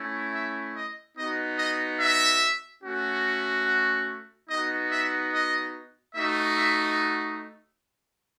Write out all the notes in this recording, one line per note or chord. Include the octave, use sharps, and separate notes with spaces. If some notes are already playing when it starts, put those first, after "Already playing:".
Already playing: A3 C#4 E4
E5
D#5
B3 D#4 F#4 D#5
D#5
E5
A3 C#4 F#4
F#5
B3 D#4 F#4 D#5
E5
D#5
A3 D#4 F#4 E5
E5